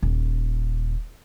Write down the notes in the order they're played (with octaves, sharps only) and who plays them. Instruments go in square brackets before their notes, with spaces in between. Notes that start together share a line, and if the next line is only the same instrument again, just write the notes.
[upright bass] D#1